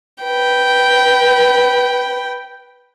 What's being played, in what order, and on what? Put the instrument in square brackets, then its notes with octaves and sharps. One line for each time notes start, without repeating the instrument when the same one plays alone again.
[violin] B4 G5